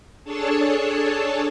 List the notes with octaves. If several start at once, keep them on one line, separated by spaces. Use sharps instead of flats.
D4 G#4 A4 C#5 A5